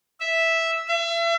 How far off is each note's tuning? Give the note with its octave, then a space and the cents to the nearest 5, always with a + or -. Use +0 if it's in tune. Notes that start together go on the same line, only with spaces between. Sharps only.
E5 -5
E5 +35